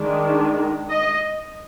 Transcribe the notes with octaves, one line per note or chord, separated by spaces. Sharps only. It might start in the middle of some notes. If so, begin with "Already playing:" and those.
Already playing: D#3 G#3 D4
D#5